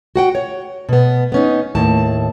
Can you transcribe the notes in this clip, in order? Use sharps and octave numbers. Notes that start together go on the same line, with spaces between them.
F#4 F#5 G5
C#5
B2 B3
B3 C#4 D#4
D#2 A2 A5